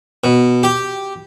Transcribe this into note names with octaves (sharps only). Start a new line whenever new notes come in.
B2
G4